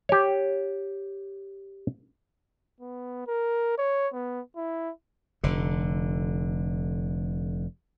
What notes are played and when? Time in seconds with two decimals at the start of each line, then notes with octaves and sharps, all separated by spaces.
0.09 G4 C#5
2.81 B3
3.27 A#4
3.78 C#5
4.13 B3
4.56 E4
5.43 F1 D3